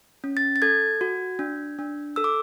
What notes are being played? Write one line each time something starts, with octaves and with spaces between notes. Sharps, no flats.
C#4
A6
A6
A4 G#6
F#4
D4
D4
A4 E6
D6